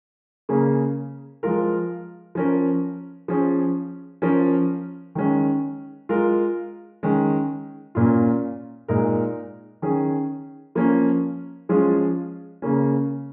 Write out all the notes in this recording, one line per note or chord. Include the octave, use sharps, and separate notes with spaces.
C#3 A#3 C#4 G#4
F3 G#3 F4 A#4
F3 C#4 A#4
F3 C#4 G#4
F3 C#4 A#4
D#3 G#3 C#4
G#3 F4 A#4
D#3 G#3 C#4
A#2 A#3 C#4 F4
A#2 G#3 D#4 A#4
D#3 C#4 G#4
F3 A#3 C#4
F3 G#3 C#4 F4 G#4
C#3 A#3 C#4